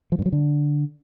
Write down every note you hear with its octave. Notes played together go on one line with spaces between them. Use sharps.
F3
G2
F#3
D3